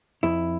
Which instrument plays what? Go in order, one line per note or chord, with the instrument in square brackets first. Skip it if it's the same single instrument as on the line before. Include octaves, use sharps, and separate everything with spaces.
[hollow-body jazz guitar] F2 E4